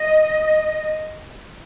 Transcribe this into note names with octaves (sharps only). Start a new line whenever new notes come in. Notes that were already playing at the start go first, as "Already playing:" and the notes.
Already playing: D#5